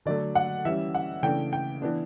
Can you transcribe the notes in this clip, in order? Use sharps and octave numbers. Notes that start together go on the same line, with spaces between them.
D3 F#3 A3 D5
F#5
E3 G3 C#4 E5
F#5
C#3 E3 A3 D4 G5
G5
E3 B3 D4